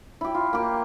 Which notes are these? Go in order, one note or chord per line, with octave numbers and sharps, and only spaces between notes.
E4 G4
F4
A#3 G4